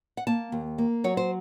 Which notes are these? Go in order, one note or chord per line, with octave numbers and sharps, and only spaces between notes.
F#5
A#3 A5
D#2
A#3
F#3 C#5
C5